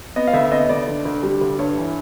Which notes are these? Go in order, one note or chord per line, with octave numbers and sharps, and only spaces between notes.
B3 D#5
F5
D2 E5
E5
B3 D#5
D#5
D2 D5
D3
D2
G3
D2
G2 C#5
E3